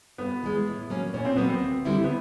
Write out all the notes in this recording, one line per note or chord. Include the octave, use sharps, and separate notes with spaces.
G2 B3
E3 G#3
A2
F#3 A#3 C#4
A#2 C#4
C4
F#3 A#3 B3
C4
D2
D3 G3 B3 E4
B3